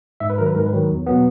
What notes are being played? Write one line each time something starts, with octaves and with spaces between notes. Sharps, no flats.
G#2 E5
B4
D#3 F#3 A#4
B4
G#2 A#4
B4
D#3 F#3
E2
B2 F#3 B3